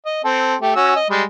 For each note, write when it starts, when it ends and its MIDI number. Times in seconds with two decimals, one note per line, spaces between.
0.06 0.24 75
0.24 0.55 60
0.24 0.55 69
0.62 0.73 57
0.62 0.73 67
0.76 0.95 61
0.76 0.95 66
0.76 0.95 88
0.96 1.05 75
1.10 1.23 55
1.10 1.23 56